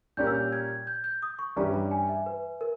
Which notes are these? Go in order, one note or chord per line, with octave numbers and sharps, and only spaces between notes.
A#2 G3 C#4 G4 A#4 G6
E6
G6
G#6
G6
G6
D#6
C#6
G2 E3 G3 C#4 G4 A#5
A#5
G#5
E5
B4
A#4